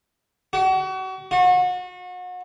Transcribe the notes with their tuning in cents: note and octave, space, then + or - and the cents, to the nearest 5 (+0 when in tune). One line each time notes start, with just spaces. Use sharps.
F#4 +35
F#4 -35